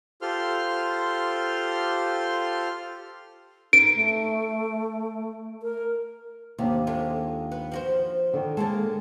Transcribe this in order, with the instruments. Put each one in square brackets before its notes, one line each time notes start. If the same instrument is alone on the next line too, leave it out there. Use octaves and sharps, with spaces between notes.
[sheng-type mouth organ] F4 G4 A4 C5 C6 F6
[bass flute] D#4 [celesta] D7
[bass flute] A3
A#4
[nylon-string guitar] D#2 D4 [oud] C3
[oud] G#3 A3 F4
B3
F3 F#4 C5
[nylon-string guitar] D3 D#3
[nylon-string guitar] G#3 A5 [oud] A#3 C#4 A4